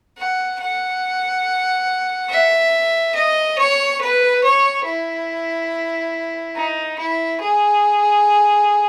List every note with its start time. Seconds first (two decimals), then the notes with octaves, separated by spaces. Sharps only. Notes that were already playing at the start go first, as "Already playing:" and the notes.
0.18 F#5
0.60 F#5
2.30 E5
3.15 D#5
3.58 C#5
4.01 B4
4.44 C#5
4.85 E4
6.56 D#4
6.99 E4
7.41 G#4